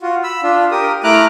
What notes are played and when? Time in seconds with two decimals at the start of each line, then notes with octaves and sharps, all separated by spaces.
0.01 F4 F#4
0.24 B5 E6
0.43 D4 F4
0.71 G4 A#4 D#6
1.04 A3 E4 A#5 D6 F6 F#6